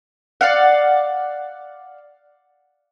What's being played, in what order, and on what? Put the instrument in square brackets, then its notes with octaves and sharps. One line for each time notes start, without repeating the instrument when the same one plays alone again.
[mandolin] D5 F5 F#5